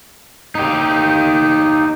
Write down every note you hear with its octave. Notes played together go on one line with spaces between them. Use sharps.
D#4 G4